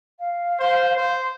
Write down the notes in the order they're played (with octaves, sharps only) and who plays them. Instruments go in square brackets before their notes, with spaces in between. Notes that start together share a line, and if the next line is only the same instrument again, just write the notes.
[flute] F5
[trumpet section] C5
C5